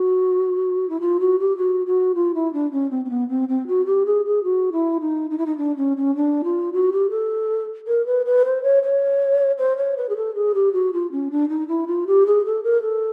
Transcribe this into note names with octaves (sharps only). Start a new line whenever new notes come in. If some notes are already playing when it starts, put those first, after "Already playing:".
Already playing: F#4
E4
F4
F#4
G4
F#4
F#4
F4
E4
D4
C#4
C4
C4
B3
C4
C4
F#4
G4
G#4
G#4
F#4
E4
D#4
D#4
E4
D#4
D4
C#4
C#4
D4
F4
F#4
G4
A4
A#4
B4
B4
C5
C#5
C#5
C5
C#5
B4
G#4
A4
G#4
G4
F#4
F4
C#4
D4
D#4
E4
F4
G4
G#4
A4
A#4
A4